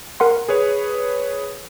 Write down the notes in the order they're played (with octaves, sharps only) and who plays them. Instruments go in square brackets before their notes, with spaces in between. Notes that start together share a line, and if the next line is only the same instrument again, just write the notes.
[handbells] A#4 F#5 C6
[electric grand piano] G#4 B4 C#5